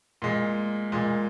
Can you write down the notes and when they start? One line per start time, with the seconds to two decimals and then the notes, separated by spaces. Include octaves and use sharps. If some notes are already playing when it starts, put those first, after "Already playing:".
0.22 A#2 G#3
0.92 A#2 G#3